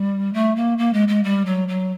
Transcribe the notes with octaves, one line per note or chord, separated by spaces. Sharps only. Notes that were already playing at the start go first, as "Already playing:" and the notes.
Already playing: G3
A3
A#3
A#3
G#3
G#3
G3
F#3
F#3